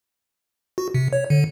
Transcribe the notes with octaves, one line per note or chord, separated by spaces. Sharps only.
F#4
C3
C#5
D3